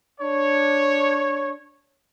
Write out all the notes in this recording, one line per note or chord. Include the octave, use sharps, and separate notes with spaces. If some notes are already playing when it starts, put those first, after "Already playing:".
D4 C#5